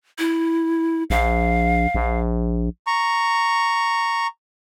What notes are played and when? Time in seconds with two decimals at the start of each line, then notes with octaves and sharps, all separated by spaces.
0.19 E4
1.10 A#1 F5
1.95 A#1
2.87 A#5 C#6